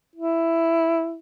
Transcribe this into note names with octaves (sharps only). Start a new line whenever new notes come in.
E4